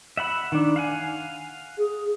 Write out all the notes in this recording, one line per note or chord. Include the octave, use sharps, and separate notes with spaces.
E5 F#5 B5
D#3 D4
F5 F#5 G#5
G#4